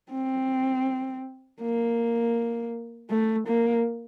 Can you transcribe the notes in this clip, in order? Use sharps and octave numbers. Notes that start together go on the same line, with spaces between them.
C4
A#3
A3
A#3